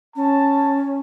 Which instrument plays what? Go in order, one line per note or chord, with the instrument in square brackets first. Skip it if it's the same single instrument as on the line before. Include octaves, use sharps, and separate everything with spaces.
[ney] C#4 [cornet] A5